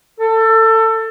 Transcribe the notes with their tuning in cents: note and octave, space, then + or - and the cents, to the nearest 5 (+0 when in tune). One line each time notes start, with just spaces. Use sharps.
A4 +25